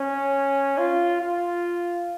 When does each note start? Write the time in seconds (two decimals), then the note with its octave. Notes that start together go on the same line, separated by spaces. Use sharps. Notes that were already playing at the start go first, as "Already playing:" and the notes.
Already playing: C#4
0.78 F4
1.21 F4